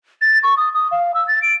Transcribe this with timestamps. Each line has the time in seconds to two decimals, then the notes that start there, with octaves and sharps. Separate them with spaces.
0.21 A6
0.43 C#6
0.57 D#6
0.74 D#6
0.91 F5
1.14 E6
1.28 A6
1.42 D7